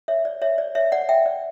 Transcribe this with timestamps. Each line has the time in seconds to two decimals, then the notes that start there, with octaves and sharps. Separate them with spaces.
0.08 C#5 E5
0.25 D5
0.42 C#5 E5
0.58 D5
0.75 C#5 E5
0.92 D5 F#5
1.09 E5 G5
1.26 D5